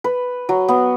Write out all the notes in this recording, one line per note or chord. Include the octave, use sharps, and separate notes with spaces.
B4
F#3
B3